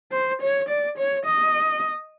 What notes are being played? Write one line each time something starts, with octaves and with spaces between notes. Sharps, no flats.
C5
C#5
D5
C#5
D#5